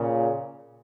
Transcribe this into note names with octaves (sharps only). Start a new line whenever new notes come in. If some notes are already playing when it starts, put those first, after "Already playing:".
Already playing: A#2 C#3